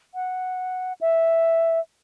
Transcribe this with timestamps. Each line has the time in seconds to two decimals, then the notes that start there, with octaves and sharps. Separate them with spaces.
0.15 F#5
1.01 E5